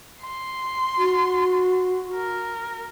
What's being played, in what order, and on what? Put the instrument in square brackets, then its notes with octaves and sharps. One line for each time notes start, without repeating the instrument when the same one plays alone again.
[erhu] C6
[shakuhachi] F#4
[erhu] A#4